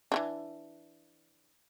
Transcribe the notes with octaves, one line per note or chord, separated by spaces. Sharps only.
E3 C#4 D4